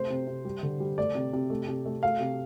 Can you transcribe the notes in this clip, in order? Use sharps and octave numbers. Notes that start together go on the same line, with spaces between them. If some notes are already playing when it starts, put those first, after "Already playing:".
Already playing: C3 A3 C5
C3
C3
G3
D3
G3
A3 D5
C3
C3
A3
C3
A3
A3 F5
C3